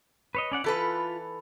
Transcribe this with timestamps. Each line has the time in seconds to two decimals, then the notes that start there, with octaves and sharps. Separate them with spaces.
0.35 B4 C#5 D#5
0.52 C#4 D5 F#5
0.64 E3 F4 A4 B4 B5